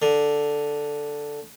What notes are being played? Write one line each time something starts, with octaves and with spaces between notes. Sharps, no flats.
D3